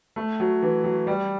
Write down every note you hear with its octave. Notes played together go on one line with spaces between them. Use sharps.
A3
F#3
E3
F#3
G3